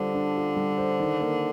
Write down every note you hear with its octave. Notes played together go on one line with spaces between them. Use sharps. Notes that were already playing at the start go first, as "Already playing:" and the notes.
Already playing: D3 G3 F4 C5
D4
F4
G3
C5
D#3
A#3